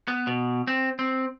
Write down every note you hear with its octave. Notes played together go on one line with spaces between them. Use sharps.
B3
B2
C4
C4